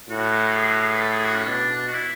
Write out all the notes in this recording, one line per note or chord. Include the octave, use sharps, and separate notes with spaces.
A2 F#4
G#4
F#4
G#4
B4
A4
G#4
F#4
C#4
B2 D4
D4
F#4
E4